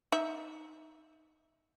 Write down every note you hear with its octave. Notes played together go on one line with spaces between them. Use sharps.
D#4 E5